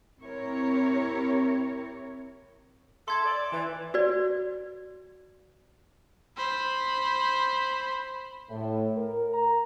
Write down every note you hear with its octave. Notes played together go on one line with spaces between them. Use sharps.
C4 E4 G4 A#4 C#5
A4 E5 C6 G#6
D5
E3
F#4 B4 D5
C5 B5
A2
A#4
A#5